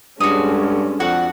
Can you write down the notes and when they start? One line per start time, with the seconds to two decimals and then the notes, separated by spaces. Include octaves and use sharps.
0.20 G2 G#3 C#4 F#4 A4 D#6
1.00 F2 D4 F#4 F#5